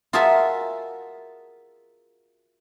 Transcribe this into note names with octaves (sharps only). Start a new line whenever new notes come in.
F4 F#4 G#4 A#4 E5 A5